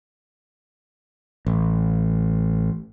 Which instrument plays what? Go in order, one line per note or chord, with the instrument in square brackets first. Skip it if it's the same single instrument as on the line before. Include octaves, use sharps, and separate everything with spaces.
[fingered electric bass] A1